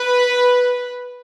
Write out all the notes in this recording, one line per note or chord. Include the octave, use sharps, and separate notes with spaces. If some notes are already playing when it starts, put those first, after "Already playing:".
Already playing: B4